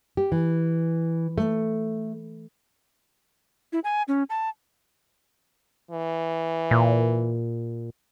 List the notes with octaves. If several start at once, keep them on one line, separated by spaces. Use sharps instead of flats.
G4
E3
A3
E4
G#5
C#4
A5
E3
A#2